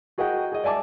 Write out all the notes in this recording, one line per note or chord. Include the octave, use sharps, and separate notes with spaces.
F#4 G#4 A#4 D#5 F#5 G5
G#4 D#5
D5 E5 G#5 A5 D6